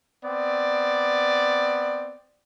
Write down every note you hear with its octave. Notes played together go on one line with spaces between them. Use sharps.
B3 C4 D5